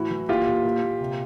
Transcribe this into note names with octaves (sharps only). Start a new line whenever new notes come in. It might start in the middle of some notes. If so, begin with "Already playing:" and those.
Already playing: A2 E3 E4 F#4
E3
A#2 F4 G4
A#2
A#2
A#2
C3